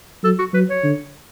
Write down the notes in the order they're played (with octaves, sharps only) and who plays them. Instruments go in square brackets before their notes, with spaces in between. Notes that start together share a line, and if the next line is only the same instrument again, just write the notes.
[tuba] F#3 [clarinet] A4
[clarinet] F#4
[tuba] F#3 [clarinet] B4
[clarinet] C#5
[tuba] D3